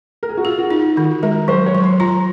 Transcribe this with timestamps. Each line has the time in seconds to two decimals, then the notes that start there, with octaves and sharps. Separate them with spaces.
0.23 A#4
0.29 G#4
0.37 F#4
0.45 F4 G#4
0.59 F#4
0.70 D#4 F4
0.96 D#3 F#4
1.23 G#3 A#4
1.48 F#3 C5
1.66 C#5
1.75 F#3
1.84 C6
2.00 F4 A#5